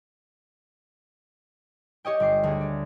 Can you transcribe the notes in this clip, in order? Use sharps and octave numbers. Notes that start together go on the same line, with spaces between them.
G4 C#5 D#5 G5
G1 D6 C7
D2 G#4
D5